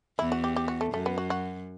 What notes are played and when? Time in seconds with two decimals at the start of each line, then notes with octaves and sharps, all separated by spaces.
0.19 E2 E4
0.32 F#4
0.44 G4
0.56 G4
0.68 F#4
0.81 A3
0.93 F#2 A3
1.06 B3
1.18 F#4
1.30 F#4